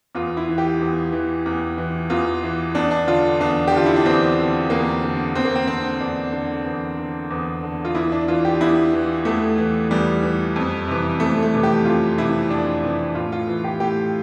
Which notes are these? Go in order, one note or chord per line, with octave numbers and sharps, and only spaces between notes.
E2 F4
E4
E3
G4
E2
E3
E2
E3
E2 F4
E3
E2 D4
D4
D3 F4
E2 D4
G4
D3 F4
E4
D4
E2 C4
D3
E2 A#3
D3
E2 C4
A#3
C4
D3 C4
E2 D4
D3
E2
D3
E2
D3
F4
E2 E4
D4
E3 F4
G4
E2 E4
E3
E2 A3
E3
E2 G3
E3
F2
C3 E3
F2 A3
A3
C3 E3
G4
F2 F4
C3 E3 E4
F2 D4
C3 E3
A2 F4
F4
E3
G4
A2 G4